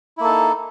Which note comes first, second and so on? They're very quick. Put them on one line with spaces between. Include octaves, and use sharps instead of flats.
E4 A#3 A4 D#4